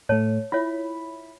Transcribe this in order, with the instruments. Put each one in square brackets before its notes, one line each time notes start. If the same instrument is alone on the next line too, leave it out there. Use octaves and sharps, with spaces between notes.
[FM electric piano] A2 A3 [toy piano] C#5 A5
[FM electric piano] E4 B5 [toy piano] F4 C#5